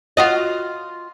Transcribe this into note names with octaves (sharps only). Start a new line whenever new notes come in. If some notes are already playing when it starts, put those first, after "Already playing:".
F4 F#4 D#5